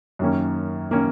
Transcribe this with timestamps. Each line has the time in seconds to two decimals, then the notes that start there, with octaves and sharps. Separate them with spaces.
0.19 F#2 D#3 A#3 C#4
0.91 D#3 A#3 C#4